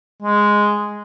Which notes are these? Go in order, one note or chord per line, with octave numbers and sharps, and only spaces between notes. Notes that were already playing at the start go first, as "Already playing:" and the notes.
G#3